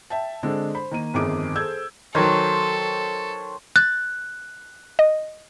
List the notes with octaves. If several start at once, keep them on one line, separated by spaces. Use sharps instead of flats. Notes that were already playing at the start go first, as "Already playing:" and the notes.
E5 G5 A5
D3 G#3 C4 D4 A4
C5 B5
D#3 A#3 D#7
G1 F2 D#3 G#4 D6 D7
G#4 A4 C5 E6 G6 G#6
D#3 F#3 A4 C5 C#5
F#6 A6
D#5